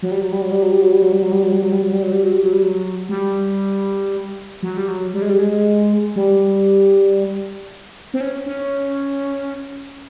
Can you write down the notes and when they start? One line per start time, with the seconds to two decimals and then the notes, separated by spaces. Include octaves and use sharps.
0.02 F#3
0.11 G3
0.21 F#3
0.32 G3
0.42 F#3
0.52 G3
0.62 F#3
0.72 G3
0.82 F#3
0.92 G3
1.02 F#3
1.12 G3
1.22 F#3
1.32 G3
1.43 F#3
1.52 G3
1.62 F#3
1.72 G3
1.82 F#3
1.93 G3
2.03 F#3
2.12 G3
2.23 F#3
2.32 G3
2.43 F#3
2.53 G3
2.63 F#3
3.09 G3
4.63 F#3
4.77 G3
4.88 F#3
5.14 G3
5.22 G#3
5.29 G3
5.39 G#3
6.16 G3
8.14 C4
8.21 C#4
8.46 C#4